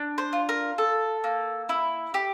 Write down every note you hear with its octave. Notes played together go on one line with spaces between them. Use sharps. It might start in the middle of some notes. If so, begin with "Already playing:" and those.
Already playing: D4
C5
F4
A#4
A4
A#3
E4
G4